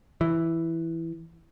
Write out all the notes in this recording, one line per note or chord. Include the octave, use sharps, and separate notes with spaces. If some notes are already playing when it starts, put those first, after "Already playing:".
E3